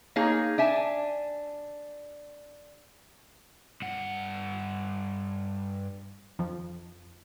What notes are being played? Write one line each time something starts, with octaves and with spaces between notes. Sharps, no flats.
A#3 D#4 G#4 C#5 G#5
D4 E5 G#5
G2 F#5
F2 F3